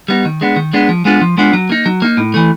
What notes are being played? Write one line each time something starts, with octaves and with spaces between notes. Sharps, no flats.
G3 B3 D#4
D#3
G#3 B3 D4
D#3
G#3 B3 D4
F3
G#3 B3 D4 F4
F3
G#3 B3 D4 F4
F#3
A#3 D#4
F#3
A#3 D#4
A2
E3 A3